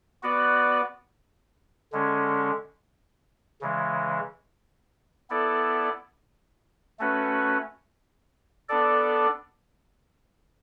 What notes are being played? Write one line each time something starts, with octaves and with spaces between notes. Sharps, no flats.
B3 F#4 B4 D5
D3 G#3 C#4
C#3 E3 G#3
B3 E4 A4 D5
A3 C#4 F#4 B4
B3 D4 A4 D5